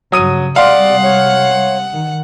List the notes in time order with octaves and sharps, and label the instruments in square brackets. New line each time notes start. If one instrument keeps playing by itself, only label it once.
[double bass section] G2 C#3 [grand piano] F#3 D#6 D#7
[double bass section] C3 G3 G#3 [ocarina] D5 [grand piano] F5 C6 [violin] F#5
[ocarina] C#5
[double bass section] D#3